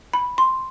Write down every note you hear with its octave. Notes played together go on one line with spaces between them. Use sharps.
B5
C6